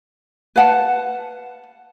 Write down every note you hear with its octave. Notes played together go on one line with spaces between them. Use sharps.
B4 F5 F#5 A5